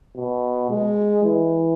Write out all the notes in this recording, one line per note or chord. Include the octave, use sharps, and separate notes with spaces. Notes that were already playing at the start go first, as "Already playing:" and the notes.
B2
G#3
E3